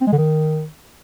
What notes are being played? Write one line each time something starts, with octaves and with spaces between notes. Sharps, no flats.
C4
G#3
D3
D#3